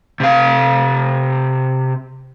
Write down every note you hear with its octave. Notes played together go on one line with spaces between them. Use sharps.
C3 F5